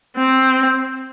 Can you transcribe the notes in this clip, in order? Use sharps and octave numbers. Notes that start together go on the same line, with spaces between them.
C4